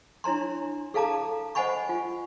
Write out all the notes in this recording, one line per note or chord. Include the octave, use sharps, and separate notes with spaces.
D4 E4 C#5 A#5 C6
G#4 A4 F5 A5 A#5 D6
C5 D#5 F#5 G#5 B5 C#6
F4